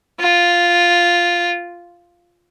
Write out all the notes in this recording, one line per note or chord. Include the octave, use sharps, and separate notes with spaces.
F4